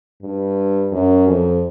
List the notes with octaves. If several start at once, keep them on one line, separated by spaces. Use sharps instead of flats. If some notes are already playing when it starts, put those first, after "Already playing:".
G2
F#2
F2